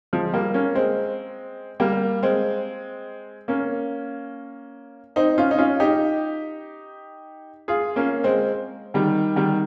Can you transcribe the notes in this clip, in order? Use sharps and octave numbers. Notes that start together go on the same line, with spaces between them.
F3 G#3
G3 A#3
A#3 C#4
G#3 C4
G3 A#3
G#3 C4
A#3 C#4
C4 D#4
C#4 F4
D#4
C#4 F4
D#4 G4
F4 G#4
A#3 C#4
G#3 C4
D#3 G3
D#3 G3